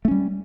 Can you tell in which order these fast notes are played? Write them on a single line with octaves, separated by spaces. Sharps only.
A3 C#4 G3